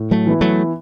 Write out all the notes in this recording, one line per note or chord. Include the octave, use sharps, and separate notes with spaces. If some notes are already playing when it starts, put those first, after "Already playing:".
Already playing: A2
F#3 A3
E3 B3 E4
F#3 A3